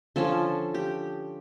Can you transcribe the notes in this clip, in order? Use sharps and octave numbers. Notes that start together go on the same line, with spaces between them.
D3 F3 C#4 A4
G4